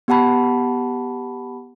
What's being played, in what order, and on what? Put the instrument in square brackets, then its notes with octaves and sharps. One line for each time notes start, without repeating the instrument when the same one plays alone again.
[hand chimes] B3 G4 F#5 A5 B5